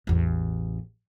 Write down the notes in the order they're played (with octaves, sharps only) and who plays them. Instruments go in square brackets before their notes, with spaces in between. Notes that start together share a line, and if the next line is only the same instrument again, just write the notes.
[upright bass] A1 E2